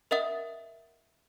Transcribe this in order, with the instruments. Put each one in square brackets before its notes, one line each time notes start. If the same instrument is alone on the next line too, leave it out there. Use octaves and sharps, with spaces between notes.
[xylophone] A#4 D#5 E5 F#5 D#6 A6